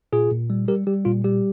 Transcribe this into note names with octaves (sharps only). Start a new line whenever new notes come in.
A#2 F4 G#4
A#2
G3
G3 G4 A#4
G3 G4
A#2 F4
G3 G4